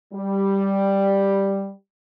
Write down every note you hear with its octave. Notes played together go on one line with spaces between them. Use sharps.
G3